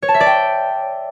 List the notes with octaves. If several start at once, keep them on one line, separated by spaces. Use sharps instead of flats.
C#5
A5
E5
D5
G5